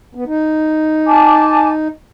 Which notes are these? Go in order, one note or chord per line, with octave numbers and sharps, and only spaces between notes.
B3
D#4
G#5 A5 D6